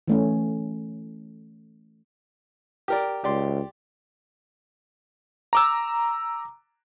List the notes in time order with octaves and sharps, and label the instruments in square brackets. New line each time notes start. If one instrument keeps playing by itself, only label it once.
[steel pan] E3 A3 C#4
[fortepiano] G4 A#4 D5
[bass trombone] C#2 [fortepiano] G4 D5 C6
[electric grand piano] A#5 D6 E6